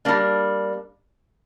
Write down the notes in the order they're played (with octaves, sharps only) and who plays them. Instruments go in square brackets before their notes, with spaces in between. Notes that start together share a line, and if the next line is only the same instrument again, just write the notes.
[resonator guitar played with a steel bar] G3 A#3 D4